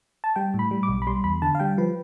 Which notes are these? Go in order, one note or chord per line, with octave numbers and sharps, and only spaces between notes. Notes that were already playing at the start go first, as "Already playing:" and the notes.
A5
G3 G5
A2
B5
G3
D6
B1
B5
G3 C6
E2 B5
D3 A5
F5
G3 G5
F3 B4